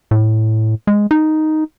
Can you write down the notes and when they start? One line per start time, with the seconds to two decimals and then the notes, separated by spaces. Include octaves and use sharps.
0.11 A2
0.87 G#3
1.11 D#4